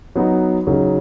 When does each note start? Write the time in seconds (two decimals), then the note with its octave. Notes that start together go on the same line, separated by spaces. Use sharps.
0.15 F#3 B3 D#4 F#4
0.67 C#3 F#3 D#4